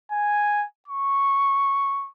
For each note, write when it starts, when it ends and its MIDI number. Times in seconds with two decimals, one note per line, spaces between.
0.11 0.65 80
0.88 2.09 85